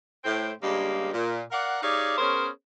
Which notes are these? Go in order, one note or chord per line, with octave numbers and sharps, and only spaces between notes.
A2 C5 G5
G2 C#3 G3 G#3 A#3 G4
A#2
A#4 D5 F5 F#5
D#4 G4 G#4 C#5 D5 F5
B3 C#4 G#4 A#4 C5 C#5